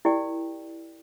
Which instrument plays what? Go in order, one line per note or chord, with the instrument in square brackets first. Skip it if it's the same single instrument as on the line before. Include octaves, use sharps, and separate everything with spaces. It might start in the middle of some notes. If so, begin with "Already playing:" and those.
[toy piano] E4 G4 A#4 D5 G5